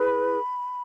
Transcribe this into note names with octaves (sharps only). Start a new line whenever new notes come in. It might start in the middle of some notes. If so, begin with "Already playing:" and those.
Already playing: E4 G#4 B4 B5